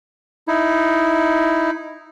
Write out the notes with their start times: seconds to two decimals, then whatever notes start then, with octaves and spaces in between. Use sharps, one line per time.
0.48 D#4 E4